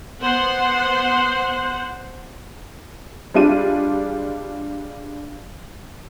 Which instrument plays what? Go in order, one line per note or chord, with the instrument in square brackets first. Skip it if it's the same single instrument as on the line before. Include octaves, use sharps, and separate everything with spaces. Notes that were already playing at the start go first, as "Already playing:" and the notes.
[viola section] B3 C5 F#5
[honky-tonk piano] G3 G#3 D4 F4 D#7